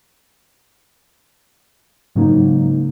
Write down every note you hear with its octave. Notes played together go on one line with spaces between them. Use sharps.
G#2 C#3 F#3 A#3 C#4 D#4